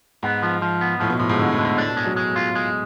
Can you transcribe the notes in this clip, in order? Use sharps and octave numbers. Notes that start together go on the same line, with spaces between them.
G#2 B3
F3
F3
B3
A2 F3
B2
A2 F3
G#2
A2 D3
A2
D3
G#2
A2 D4
B2
G#3
F#3
G#3
F4
G#3